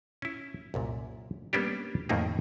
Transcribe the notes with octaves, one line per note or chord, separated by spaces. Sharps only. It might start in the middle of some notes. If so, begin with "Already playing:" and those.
C#4 E4
C2 F#2 A#2
G3 A#3 B3 C#4 D4 G4
F2 A2 D#3 A3 A#3 D#4